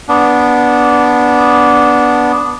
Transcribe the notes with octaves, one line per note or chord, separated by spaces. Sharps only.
B3 D4